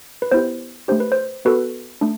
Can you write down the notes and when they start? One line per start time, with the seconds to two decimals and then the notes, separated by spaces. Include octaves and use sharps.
0.22 B4
0.32 B3 E4 G4 C5
0.88 A3 D4 G4 C5
1.00 B4
1.12 C5
1.45 B3 F#4 A4 B4
2.01 A3 D4